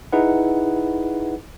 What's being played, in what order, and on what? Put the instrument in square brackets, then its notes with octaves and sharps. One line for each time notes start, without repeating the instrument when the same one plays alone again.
[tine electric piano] D#4 E4 G#4 B4 F#5